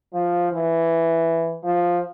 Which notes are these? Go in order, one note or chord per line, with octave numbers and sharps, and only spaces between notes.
F3
E3
F3